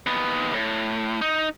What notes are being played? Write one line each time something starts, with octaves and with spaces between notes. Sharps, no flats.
D#2 B3
A2
D#4